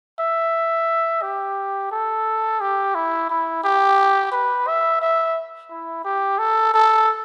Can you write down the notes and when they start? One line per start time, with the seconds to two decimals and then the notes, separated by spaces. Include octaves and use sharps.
0.20 E5
1.22 G4
1.91 A4
2.61 G4
2.95 E4
3.30 E4
3.64 G4
4.32 B4
4.67 E5
5.02 E5
5.71 E4
6.05 G4
6.38 A4
6.74 A4